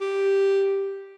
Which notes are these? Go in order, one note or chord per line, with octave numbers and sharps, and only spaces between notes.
G4